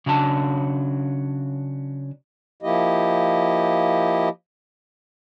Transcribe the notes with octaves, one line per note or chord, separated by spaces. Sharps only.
C#3 F#3 C#4 D4 A5
F3 A#3 E4 G4 D#5